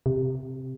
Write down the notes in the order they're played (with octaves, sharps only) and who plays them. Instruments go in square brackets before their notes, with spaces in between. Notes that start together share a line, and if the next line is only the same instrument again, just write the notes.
[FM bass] C3